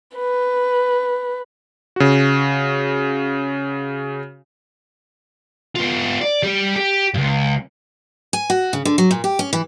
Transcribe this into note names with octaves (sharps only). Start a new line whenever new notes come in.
B4
C#3 F#4
B3 F4
D5
G3 G4
G4
C#2 G2
G#5
F#4
C#3
D3
F#3
A#2
G4
C#4
E3